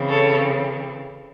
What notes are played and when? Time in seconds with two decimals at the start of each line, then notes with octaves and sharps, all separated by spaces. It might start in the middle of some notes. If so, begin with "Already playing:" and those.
Already playing: C#3 E3 C4
0.09 A4 C#5